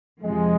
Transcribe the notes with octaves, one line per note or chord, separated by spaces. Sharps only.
F2 C3 F3 G#3